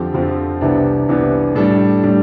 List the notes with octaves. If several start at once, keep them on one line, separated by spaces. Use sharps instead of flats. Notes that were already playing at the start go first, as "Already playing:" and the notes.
Already playing: F2 D3 F3 C4 G4
F2 D3 F3 C4
C2 C3 E3 B3 D4
C2 C3 E3 B3 D4
A2 G3 D4 A4
A2 G3 D4